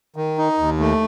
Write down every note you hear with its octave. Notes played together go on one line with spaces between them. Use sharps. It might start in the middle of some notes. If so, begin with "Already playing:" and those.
D#3
D#4
D#2
A3